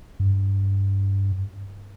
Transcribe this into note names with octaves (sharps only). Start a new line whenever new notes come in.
G2